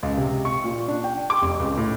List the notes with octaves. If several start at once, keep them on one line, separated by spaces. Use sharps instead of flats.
C#2
C3
C#6
A#2
D4
G5
D6
F1
C#2
A2